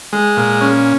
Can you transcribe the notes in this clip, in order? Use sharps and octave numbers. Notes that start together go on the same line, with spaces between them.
G#3
A#2
C#4